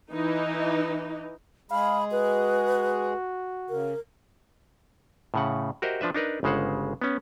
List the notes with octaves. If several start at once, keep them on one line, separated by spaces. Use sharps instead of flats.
E3 D#4
G#3 G#4 F5 B5
F#4 B4
C#3 A#4
A2 C#3 F#5
F#4 G4 A#4 C5 D#5 E5
F3 D4 B4 E5
D4 D#4 A#4 B4
G1 C#3 G#3 C5 F#5
B3 C#4